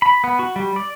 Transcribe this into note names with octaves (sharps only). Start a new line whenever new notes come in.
B5
B3
F#4
G3
D5